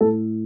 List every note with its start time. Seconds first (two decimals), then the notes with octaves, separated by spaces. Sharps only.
0.01 A2 A4